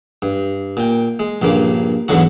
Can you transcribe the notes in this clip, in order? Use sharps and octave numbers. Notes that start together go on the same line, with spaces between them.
G2
A#2 G5
G#3
A#1 G2 C#3 A#3
E2 G#2 D3 F#3 F#4